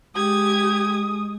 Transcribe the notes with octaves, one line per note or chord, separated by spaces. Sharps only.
G#3 G4 D#6 G#6